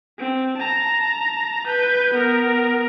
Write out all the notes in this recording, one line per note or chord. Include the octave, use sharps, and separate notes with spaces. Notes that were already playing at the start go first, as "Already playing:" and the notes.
C4
A5 A#5
B4 G6
B3 A#4